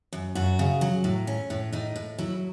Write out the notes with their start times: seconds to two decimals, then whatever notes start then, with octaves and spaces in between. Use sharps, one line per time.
0.13 F#2
0.35 F#2 F#4
0.59 C#3
0.81 F#3
1.04 A2
1.27 C#4
1.50 A2
1.72 A2 D#4
1.96 A2
2.18 F#3 E4